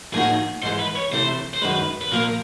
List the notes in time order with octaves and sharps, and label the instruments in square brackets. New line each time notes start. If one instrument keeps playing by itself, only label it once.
[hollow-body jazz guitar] A2 F3 A#3 D#4 F#4 [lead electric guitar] G#4
[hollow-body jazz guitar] G#2 E3 G#3 [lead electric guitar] C5
[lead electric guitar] B4
C#5
[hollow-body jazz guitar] C3 E3 A3 [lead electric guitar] C5
[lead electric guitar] C5
[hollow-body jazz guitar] F#2 D#3 G#3 [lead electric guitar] B4
[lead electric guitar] B4
[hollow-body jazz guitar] A#2 F3 A#3 [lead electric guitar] A#4